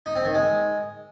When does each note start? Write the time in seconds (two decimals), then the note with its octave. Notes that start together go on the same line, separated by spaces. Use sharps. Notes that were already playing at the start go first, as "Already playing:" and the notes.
0.06 D#4
0.15 C4
0.25 D#3
0.34 G#3